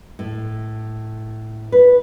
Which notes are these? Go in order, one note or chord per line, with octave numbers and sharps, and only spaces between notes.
A2
B4